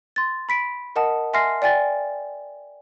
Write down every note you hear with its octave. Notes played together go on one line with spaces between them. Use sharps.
C6 A6
B5 B6 D7
A#4 D#5 F#5 A5 D#6
E5 G#5 C6 F6 A#6 C7
D5 G5 G#5 A6